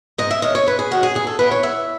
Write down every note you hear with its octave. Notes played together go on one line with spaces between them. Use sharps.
G#2 D#5
E5
D#3 G#3 C#4 D#5
C#5
G#2 B4
G#4
D#3 G#3 C#4 F#4
G#4
E2 G#4
A4
C#3 E3 B3 B4
C#5
E2 E5